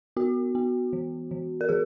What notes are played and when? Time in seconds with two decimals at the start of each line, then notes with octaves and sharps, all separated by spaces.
0.17 B3 F#4
0.55 B3
0.93 E3
1.31 E3
1.61 A#4
1.69 E3 G#4